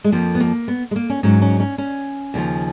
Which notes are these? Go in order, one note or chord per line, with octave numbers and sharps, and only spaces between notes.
G#3
F2 F3 A#3
B3
A#3
B3
G#3
A#3
C#4
G#2 F#3 C#4
C#4
C#4
C#4
D#2 C#3 F3